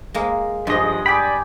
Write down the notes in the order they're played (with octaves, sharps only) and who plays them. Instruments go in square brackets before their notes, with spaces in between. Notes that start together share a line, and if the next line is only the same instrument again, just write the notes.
[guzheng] G#3 A#3 A#4
[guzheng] G2 [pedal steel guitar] F3 D#5 [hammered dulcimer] G#3 G#4
[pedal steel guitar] D5 B5 [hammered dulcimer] G5 G#5 D6